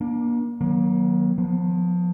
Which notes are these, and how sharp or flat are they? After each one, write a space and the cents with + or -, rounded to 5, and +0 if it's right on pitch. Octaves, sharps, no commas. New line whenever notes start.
A#3 +35 D4 +0
D#3 +0 F#3 +0 A#3 +40
F3 +25 B3 +0